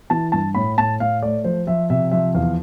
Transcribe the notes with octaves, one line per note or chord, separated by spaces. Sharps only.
E3 A5
G2 A5
A2 B5
A2 A5
A2 F5
A3 D5
F3 C5
F3 E5
C3 E5
F3 E5
E2 F5